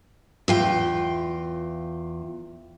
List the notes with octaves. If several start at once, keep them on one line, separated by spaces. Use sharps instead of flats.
E2 F4 G5